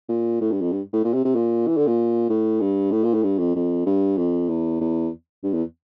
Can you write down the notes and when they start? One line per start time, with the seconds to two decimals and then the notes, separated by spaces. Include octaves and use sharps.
0.09 A#2
0.41 A2
0.51 G2
0.61 F2
0.72 G2
0.93 A2
1.04 A#2
1.14 C3
1.25 C3
1.35 A#2
1.67 E3
1.77 D3
1.87 A#2
2.29 A2
2.60 G2
2.91 A2
3.04 A#2
3.14 A2
3.23 G2
3.39 F2
3.55 F2
3.86 G2
4.18 F2
4.49 E2
4.80 E2
5.43 G2
5.54 E2